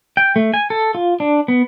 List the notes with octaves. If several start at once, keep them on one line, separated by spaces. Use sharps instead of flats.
G5
A3
G#5
A4
F4
D4
B3